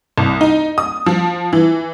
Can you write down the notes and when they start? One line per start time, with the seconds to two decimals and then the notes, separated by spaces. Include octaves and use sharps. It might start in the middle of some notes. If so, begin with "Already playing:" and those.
0.18 C2
0.41 D#4
0.78 D#6
1.06 F3
1.53 E3